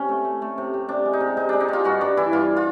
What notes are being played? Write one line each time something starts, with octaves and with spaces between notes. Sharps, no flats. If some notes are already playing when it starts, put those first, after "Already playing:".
Already playing: C3 C#4
A3
A3
A3
C3
C3
C3 D4
G#3
D#4
C3
C3 D#4
G#3 D4
D#4
C3 F4
G2 F#4
G2 D4
E3 E4
G2 F4
F4